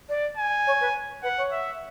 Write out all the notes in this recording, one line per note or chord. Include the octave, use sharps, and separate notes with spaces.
D5
G#5
C#5
B4
B4 F#5
C#5
E5